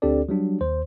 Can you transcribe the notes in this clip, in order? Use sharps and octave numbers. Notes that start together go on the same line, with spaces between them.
D2 C4 D4 G4 A4 D5
F#3 G3 D4 F#4
D#2 C5